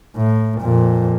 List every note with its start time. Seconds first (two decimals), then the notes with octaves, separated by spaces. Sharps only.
0.17 A2
0.62 F2 A#2